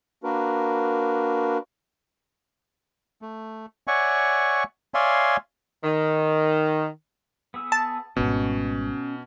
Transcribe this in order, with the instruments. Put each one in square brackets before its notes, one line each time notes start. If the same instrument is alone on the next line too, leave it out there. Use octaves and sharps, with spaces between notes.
[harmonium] A#3 D4 F#4 A#4 B4
[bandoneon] A3
C#5 D5 E5 F#5 G#5 C#6
C#5 D5 E5 F5 G#5 C6
[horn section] D#3
[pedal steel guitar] B3 G#4 E6
[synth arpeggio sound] A5
[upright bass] G#1 G3 [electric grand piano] B2 [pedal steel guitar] C#4